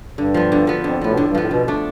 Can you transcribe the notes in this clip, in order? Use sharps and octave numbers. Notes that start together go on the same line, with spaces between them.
G2 D3
F3 B3
D3
F3 B3
F2 D3
A2 F3 B3
B2
A2 D3
G2
A2 F3 B3
B2 D3
A3 D4